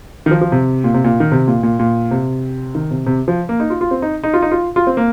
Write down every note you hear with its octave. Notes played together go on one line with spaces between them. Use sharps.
D#3
F3
F3
C3
A#2
C3
A#2
D#3
C3
A#2
A#2
A#2
C3
D#3
C3
C3
F3
A#3
D#4
F4
F4
C4
D#4
D#4
F4
D#4
F4
F4
C4
A#3